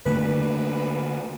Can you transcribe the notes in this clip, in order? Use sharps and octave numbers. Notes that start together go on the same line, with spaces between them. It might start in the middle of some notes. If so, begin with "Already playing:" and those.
D3 A3 A#3 B4